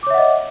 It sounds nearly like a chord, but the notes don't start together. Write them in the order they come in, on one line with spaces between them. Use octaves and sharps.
D6 C#5 E5 F#5 D#5